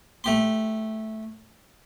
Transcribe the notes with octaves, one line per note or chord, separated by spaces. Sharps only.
A3 G4 C6